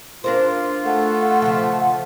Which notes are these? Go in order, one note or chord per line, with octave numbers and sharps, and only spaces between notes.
D4 F4 A#4 C5
A3 F#5
C#3 F3